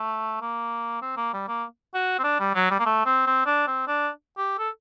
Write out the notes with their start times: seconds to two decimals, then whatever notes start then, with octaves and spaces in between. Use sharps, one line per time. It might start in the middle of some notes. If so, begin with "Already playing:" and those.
Already playing: A3
0.41 A#3
1.02 C4
1.17 A#3
1.33 G3
1.48 A#3
1.94 F#4
2.19 C4
2.24 D4
2.40 G3
2.55 F#3
2.70 G3
2.79 A#3
2.86 A3
3.05 C4
3.27 C4
3.46 D4
3.67 C4
3.87 D4
4.37 G4
4.58 A4